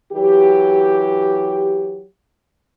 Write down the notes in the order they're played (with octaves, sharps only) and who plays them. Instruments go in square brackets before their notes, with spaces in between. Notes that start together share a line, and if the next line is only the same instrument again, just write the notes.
[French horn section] E3 F#3 G4